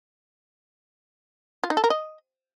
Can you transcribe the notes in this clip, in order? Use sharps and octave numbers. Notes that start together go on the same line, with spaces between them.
F4
D#4
A4
A#4
D#5